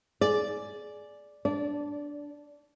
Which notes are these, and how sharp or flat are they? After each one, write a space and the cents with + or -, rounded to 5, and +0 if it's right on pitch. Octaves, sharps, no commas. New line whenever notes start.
G#4 +20 D5 +0
D4 -5 D5 -20